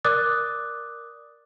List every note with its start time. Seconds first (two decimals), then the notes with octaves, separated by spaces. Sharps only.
0.04 A#4 D5 D6 D#6 F#6 A6